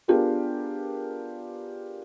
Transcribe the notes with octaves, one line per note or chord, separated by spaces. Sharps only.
B3 D4 F4 G4 G#4 A#4